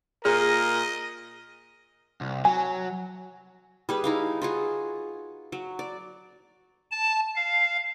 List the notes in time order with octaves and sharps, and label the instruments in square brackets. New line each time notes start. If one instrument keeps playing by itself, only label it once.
[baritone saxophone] A#2 [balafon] G#4 [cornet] A#4 [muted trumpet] D#5
[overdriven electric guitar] C2
[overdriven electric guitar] F#3 [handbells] G#5
[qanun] G3 G#4 B4
D#4 E4 F5
F4 F#4 G#4
F#3
D5
[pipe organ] A5
F5